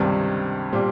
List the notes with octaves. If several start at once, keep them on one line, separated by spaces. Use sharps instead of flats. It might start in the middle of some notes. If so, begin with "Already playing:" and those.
Already playing: C#2 G2 C3 D#3
A#2 G3 C4 G4